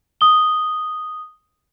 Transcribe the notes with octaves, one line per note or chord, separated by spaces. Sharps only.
D#6 G7